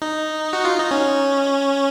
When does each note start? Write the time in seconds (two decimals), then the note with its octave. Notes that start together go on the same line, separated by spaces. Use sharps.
0.02 D#4
0.53 F#4
0.65 F4
0.78 D#4
0.91 C#4